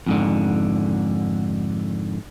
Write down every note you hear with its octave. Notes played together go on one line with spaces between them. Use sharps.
F2 G#2 D3